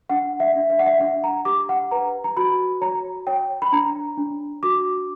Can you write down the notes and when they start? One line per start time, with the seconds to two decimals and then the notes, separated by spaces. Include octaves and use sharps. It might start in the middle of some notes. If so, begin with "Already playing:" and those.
0.10 D4 F#5
0.40 E5
0.56 D4
0.70 E5
0.79 F#5
0.86 E5
1.00 D4 F#5
1.24 A#5
1.45 G4 D6
1.69 F#5
1.91 B4 A#5
2.24 A#5
2.37 F#4 B5
2.81 C#5 A#5
3.27 C#5 G5
3.62 B5
3.72 D4 A#5
4.17 D4
4.63 F#4 D6